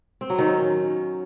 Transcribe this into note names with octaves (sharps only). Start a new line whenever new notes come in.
C4
F#3
D#3
C#4